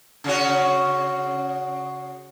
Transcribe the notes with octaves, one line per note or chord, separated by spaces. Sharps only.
C#3 C#4 F#4